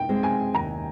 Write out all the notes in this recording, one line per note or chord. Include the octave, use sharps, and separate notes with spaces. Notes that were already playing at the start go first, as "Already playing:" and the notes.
Already playing: G5
G#3 C4
G#5
D#2 A#5